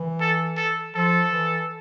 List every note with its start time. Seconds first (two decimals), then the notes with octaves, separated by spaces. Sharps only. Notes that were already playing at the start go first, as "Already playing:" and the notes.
Already playing: E3
0.20 A4
0.57 A4
0.96 F3 A4
1.33 E3